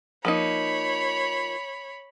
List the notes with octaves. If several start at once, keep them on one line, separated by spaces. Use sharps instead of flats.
F3 A#3 D#4 C#5 B5